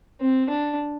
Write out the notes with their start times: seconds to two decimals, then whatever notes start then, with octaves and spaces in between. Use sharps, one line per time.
0.21 C4
0.49 D4